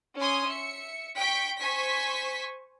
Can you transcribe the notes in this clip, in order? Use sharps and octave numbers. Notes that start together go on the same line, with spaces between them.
C#4 G#5 C6 D#6
E5 C#7
G5 C#6 B6 D7
C5 G#5 C#6 B6